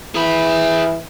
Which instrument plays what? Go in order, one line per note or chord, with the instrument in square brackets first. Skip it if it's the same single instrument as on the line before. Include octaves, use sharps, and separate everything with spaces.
[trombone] E3 [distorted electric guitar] G#4 B5